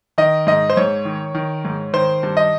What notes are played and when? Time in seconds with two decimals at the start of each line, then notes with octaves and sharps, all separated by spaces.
0.18 D#3 D#5
0.47 G#2 D#5
0.70 C5
0.77 G#2 C#5
1.05 D#3
1.35 D#3
1.65 G#2
1.93 D#3 C5
2.23 G2
2.37 D#5